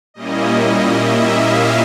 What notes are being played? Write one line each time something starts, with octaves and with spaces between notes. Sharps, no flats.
A#2 G3 A#3 C#4 E4 D#5
E5
F5